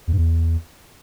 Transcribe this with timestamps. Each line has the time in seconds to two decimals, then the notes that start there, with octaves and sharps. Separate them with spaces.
0.07 E2
0.13 G2
0.18 E2